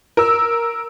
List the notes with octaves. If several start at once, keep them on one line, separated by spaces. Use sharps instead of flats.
A#4 E6